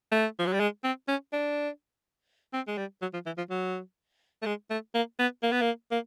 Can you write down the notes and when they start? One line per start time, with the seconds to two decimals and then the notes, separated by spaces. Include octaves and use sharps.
0.12 A3
0.39 F3
0.47 F#3
0.53 G3
0.60 G#3
0.84 C4
1.08 C#4
1.33 D4
2.53 C4
2.68 G#3
2.77 G3
3.02 F#3
3.13 F3
3.26 E3
3.38 F3
3.50 F#3
4.42 A3
4.46 G#3
4.70 A3
4.94 A#3
5.19 B3
5.43 A#3
5.52 B3
5.61 A#3
5.91 A#3